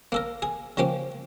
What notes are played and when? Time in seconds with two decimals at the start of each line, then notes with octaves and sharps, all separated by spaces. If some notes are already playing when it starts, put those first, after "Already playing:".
0.12 A#3 A4 A#4
0.42 G#4
0.77 C#3 F3 A#3 G4 D6